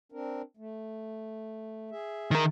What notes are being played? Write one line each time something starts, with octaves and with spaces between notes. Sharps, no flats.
C4 D4 A#4
A3
G#4 E5
D#3 A#4